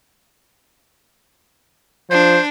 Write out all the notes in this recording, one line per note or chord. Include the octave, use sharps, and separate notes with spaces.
F3 D4 C5